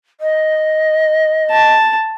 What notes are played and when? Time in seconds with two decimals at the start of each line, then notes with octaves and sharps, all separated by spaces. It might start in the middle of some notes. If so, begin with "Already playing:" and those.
0.20 D#5
1.51 A5